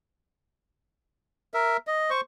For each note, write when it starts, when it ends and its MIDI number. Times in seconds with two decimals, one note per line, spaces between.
1.54 1.77 70
1.54 1.77 76
1.87 2.10 75
2.10 2.21 72
2.10 2.21 85